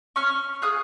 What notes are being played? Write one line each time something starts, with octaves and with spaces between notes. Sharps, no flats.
C#4 C#6 F6
F4 G#4 D#6 F#6